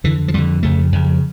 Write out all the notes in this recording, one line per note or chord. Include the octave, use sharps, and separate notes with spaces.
F2 D3 E3
F3
F2 D3 G3
F2 C#3 A3
F2 C#3